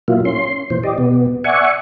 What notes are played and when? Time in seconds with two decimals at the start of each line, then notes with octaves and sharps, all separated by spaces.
0.08 A#2 F#3 A#3 E4 F4
0.25 C#4 C6
0.70 A#2 E3 C5
0.83 G4 D5 D#5
0.98 B2 B3
1.44 D5 E5 F#5 G#5 C#6